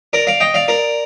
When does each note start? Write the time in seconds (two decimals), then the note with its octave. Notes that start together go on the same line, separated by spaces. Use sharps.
0.13 A#4 D5
0.27 D5 F5
0.40 D#5 G5
0.54 D5 F5
0.68 A#4 D5